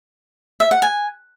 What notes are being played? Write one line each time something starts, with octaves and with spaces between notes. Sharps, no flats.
E5
F#5
G#5